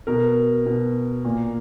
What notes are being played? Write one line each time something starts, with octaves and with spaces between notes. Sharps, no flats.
B2 A#4
B2
A#2